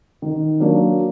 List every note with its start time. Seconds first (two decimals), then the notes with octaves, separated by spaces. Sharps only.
0.22 D#3
0.60 F#3 A#3 D4